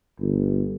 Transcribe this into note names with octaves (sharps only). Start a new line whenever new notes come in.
G1